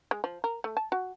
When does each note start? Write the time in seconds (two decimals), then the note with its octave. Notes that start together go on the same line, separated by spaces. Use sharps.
0.11 G#3
0.24 F3
0.44 A#4
0.64 A3
0.77 A5
0.92 F#4